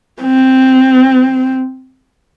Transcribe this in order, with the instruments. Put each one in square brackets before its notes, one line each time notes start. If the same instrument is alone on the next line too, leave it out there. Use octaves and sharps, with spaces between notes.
[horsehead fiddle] C4